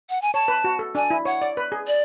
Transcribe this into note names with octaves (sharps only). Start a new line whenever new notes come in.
F#5
G#5
C#5 A5
B4
F#4
A4
D4 G#5
E4
C#5 F#5
D5
B4
G#4
D5